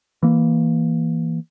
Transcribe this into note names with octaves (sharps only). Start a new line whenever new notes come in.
E3 A#3